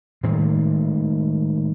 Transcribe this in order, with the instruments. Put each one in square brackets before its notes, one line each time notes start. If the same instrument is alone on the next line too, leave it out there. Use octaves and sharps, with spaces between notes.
[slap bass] A2 D#3 G3 G#3